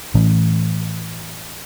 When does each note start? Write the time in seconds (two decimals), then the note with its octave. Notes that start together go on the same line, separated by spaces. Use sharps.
0.14 A2 E3 A3 C#4